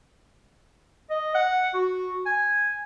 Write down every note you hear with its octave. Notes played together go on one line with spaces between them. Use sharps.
D#5
F#5
F#4
G#5